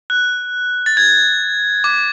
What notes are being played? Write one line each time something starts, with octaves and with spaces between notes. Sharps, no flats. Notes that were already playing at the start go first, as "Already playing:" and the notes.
F#6
A6
G#6
D6